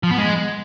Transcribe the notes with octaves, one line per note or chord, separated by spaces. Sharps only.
F3
B3
G#3